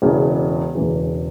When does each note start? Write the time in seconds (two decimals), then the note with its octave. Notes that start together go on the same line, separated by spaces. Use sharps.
0.02 E1 E2 C#3 E3
0.75 E1 E2 C#3 E3